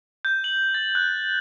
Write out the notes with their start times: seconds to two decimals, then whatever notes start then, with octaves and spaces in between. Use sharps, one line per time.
0.25 G6
0.44 F#7
0.74 A6
0.95 F#6